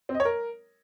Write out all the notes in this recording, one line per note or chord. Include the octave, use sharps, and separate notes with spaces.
C4
D#5
C#5
A#4